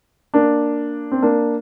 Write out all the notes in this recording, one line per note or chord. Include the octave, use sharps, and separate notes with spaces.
A#3 D4
C4
A#3 D4